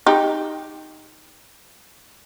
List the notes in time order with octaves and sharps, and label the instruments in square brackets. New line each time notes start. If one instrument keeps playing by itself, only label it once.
[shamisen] D#4 G4